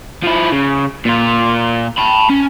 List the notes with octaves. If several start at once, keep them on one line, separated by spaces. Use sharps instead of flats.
F3 E4
C#3
A#2 F4
A5 B5
C#4